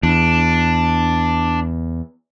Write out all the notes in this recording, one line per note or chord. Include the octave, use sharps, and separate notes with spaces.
E2 D4